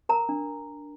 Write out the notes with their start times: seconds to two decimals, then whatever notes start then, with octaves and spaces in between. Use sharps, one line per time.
0.09 A#4 A#5
0.29 D4